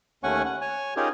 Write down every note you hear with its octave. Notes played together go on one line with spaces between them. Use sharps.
D#2 A3 C#4 F#5 G#5 C#6
F#5
C#5 G#5 C#6
C#4 D#4 F4 G4 G#4 A#4